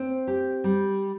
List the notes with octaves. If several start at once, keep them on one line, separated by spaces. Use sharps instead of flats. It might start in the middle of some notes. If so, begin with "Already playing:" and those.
Already playing: C4
G4
G3